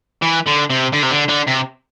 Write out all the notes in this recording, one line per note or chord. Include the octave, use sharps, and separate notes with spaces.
E3
D3
C3
D3
C3
D3
D3
C3